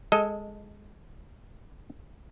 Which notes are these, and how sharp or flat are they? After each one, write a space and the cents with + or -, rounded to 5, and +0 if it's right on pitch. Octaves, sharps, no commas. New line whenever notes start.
G#3 -10 A4 +0 D#5 +15